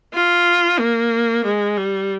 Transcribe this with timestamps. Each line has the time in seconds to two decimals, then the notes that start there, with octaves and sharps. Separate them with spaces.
0.14 F4
0.79 A#3
1.44 G#3
1.77 G3